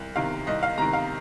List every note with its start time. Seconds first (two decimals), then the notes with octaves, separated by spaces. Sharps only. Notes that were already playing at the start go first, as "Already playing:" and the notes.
Already playing: C2
0.16 C3 D#3 F5
0.47 C2 D#5
0.63 F5
0.78 C3 A#5
0.82 D#3
0.93 F5